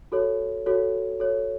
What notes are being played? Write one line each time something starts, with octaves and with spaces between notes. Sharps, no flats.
F#4 A4 C#5
F#4 A4 C#5
F#4 A4 C#5